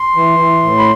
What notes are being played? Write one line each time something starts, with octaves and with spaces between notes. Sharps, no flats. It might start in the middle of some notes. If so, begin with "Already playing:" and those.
Already playing: C6
E3
E3
A2
B5